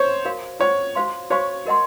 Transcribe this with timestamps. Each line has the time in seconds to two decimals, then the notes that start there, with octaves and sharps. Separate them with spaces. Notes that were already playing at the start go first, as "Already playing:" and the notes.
Already playing: C5 C#5
0.25 F#4 A#4 C#5 F5
0.60 F4 C5 C#5 F#5
0.95 F#4 C5 F5 C6
1.30 F#4 C5 C#5 F5 G#5 C#6
1.65 F#4 A#4 D#5 F#5 C6